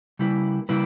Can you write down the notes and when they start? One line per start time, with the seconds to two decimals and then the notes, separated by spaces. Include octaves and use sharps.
0.19 C#3 G3 A#3 E4 B4
0.69 C#3 G3 A#3 E4 B4